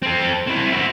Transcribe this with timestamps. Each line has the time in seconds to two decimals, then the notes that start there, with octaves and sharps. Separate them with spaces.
0.03 C4 A4
0.47 C4 E4
0.73 F#4 E5